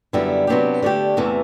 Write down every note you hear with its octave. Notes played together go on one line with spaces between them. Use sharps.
F#2 D3 G3 B3 E4
C3 F#3 B3 D4 G4
D3 A3 D4 G4
E2 C3 E3 A3